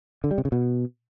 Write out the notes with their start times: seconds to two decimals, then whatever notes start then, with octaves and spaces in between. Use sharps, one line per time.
0.24 D3
0.31 G3
0.38 C3
0.45 C#3
0.52 B2